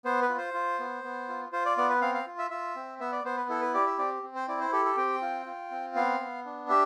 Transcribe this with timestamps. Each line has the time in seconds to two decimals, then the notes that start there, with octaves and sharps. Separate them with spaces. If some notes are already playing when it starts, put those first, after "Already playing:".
0.05 B3 C5
0.22 B4
0.29 F4
0.38 C5
0.54 F4
0.79 B3
1.04 B3
1.29 F4
1.52 F4 C5
1.66 D5
1.77 B3 D5
1.89 B4
2.01 C4 F5
2.15 F5
2.26 F4
2.38 E5
2.51 F4 E5
2.76 C4
3.00 B3 E5
3.12 D5
3.24 B3 C5
3.37 B4
3.49 E4 A4
3.61 B4
3.74 G4 D5
3.86 E5
3.99 C4 D5
4.23 C4
4.35 C5
4.48 E4 D5
4.61 C5
4.72 G4 A4
4.85 A4
4.97 C4 G5
5.22 F4
5.46 F4
5.71 C4
5.95 B3 F5
6.20 B3
6.45 D4
6.69 G4 E5